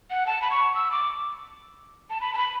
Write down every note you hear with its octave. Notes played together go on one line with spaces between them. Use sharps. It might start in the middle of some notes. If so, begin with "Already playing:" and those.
F#5
A5
B5
C#6
E6
D6
A5
B5
A5
B5